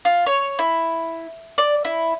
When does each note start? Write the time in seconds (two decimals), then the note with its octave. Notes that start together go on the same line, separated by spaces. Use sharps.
0.05 F4
0.26 C#5
0.59 E4
1.58 D5
1.85 E4